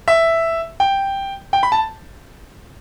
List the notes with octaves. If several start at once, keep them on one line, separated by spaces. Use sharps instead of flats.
E5
G5
G5
B5
A5